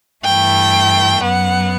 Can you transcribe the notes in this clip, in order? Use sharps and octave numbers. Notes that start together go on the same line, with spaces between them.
G2 E3 A3 G5
F#2 F#3 B3 F#5